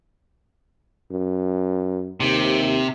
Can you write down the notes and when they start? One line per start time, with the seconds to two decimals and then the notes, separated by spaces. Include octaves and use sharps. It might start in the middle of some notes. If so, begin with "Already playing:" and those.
1.11 F#2
2.20 D#2 C3